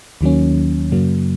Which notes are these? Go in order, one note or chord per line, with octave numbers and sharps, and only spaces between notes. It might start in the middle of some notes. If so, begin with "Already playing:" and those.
D#2 D#3 F#3 A#3 C#4
F#2 C#3 F#3 A#3